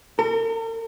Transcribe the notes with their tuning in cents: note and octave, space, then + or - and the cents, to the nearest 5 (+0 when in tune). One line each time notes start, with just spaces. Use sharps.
A#4 -45